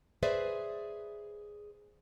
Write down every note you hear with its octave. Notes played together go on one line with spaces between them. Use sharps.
G#4 B4 C5 D5 E5